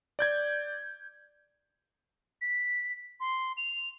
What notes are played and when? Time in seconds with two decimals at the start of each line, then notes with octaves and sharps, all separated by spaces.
0.19 D5 G6 G#6
2.41 B6
3.20 C6
3.57 F7